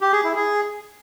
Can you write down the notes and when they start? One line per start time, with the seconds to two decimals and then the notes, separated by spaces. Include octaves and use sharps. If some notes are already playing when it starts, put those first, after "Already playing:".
0.01 G4
0.12 G#4
0.24 E4
0.36 G#4